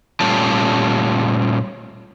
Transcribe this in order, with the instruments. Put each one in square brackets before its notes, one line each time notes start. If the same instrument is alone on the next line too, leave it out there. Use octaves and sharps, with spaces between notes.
[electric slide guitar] A#2 G3 A3 C#4 F4 A5